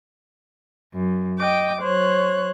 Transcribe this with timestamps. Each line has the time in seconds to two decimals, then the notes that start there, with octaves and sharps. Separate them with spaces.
0.94 F#2
1.38 D#5 G5 D6
1.80 F#3 C5 C#5 F#6